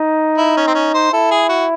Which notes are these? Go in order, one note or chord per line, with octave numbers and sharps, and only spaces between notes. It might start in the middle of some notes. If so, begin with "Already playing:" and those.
Already playing: D#4
E4
C#4
C4
C#4
C5
E4 A4
G#4
F#4